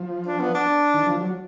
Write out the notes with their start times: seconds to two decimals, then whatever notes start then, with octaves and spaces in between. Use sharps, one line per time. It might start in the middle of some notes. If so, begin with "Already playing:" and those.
Already playing: F3
0.27 D4
0.40 B3
0.55 D4
0.94 D#3
1.07 F3
1.21 F#3